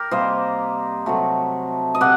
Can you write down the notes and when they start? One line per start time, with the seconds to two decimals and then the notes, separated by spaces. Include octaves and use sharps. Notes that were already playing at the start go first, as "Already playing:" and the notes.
Already playing: G4 A#4
0.11 C3 G3 A#3 C5 D#5
1.06 C3 F#3 A3
1.95 D#5
2.01 C3 D5 F#5